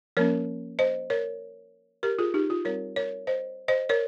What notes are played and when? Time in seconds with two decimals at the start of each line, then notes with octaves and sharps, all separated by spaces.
0.17 F3 A#3 C#4 A#4 C#5
0.79 C5 D#5
1.10 A#4 C#5
2.03 G4 A#4
2.19 F4 G#4
2.34 D#4 G4
2.50 F4
2.65 G3 C4 A#4 C#5
2.96 A#4 C#5
3.27 C5 D#5
3.68 C5 D#5
3.89 A#4 C#5